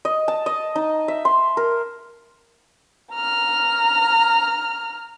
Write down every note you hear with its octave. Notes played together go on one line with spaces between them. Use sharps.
D#5
A5
D#5
D#4
E5
C6
A#4
A#5 F6